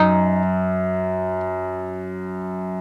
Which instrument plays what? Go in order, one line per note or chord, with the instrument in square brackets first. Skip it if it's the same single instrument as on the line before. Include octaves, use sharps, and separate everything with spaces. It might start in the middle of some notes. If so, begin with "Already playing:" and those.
Already playing: [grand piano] F#2 [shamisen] D#4